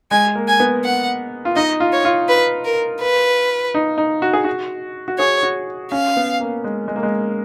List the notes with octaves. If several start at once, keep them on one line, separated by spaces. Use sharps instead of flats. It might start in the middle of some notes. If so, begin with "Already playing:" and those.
G#3 G#5
A#3
G#5
B3
F#5
F4
D#4 D#5
F4
C#5
F4
B4
A#4
B4
D#4
D#4
F#4
G#4
F#4
F#4
G#4 C#5
F#4
C#4 F5
B3
A#3
G#3
G#3
A#3
G#3